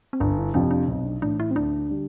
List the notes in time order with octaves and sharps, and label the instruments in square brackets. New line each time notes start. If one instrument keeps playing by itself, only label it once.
[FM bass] C4
[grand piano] G1 [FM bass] D4
[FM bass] E4
[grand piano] F2 C3 F3 [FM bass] D4
[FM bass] D4
[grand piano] B1 [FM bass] C4
[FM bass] D4
[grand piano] A2 E3 [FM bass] D4
[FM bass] E4
C4
[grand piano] D2 [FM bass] D4
[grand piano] D3 G3